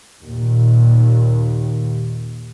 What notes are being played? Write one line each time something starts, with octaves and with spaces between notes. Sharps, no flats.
D#2 A#2